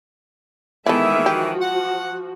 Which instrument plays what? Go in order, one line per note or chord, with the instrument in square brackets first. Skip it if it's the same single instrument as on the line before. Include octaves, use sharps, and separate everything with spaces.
[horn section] D#3 E3 [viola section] G#3 B3 E5 [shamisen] E4 A4
[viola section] F3 F#4 [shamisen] G4
[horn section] F#5